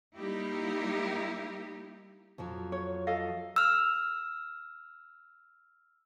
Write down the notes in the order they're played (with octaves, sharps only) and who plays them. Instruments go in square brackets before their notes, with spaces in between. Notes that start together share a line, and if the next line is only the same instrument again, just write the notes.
[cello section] G3 A#3 D#4 E4 G4
[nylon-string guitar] F2 F3 F#3
[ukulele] C#5
A4 D#5 F5
[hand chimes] E6 F6